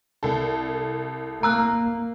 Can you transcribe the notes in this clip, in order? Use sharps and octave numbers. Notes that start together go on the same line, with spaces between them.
C2 A4
A#3 A#5 E6 F#6